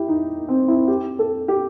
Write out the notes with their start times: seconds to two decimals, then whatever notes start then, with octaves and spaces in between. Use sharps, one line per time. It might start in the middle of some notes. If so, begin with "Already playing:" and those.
Already playing: E4 G4
0.08 D#4
0.48 C4
0.68 E4
0.88 G4
1.19 A4
1.48 G4